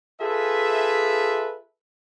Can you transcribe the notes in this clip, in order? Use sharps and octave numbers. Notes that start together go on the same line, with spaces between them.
F4 G#4 A4 B4 E5